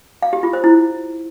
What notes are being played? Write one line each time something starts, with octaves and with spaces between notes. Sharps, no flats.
F5
G4
F4
C5
E4